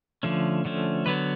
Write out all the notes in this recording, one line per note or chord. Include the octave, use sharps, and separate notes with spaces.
D3 F3 A3 C#4
D3 F3 A3 C#4
D3 F#3 B3 B4